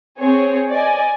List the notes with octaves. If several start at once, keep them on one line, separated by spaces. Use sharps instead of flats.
C4 G#4 C#5
D5 D#5 G#5